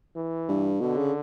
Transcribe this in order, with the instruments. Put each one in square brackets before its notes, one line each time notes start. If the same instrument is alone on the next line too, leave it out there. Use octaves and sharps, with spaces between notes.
[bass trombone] E3
[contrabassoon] G2
[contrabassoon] B2 [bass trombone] D3
[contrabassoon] C#3